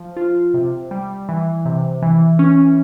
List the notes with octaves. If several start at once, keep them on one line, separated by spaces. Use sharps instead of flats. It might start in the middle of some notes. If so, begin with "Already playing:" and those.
Already playing: F3
F4
C3
G3
E3
C3
E3
C#4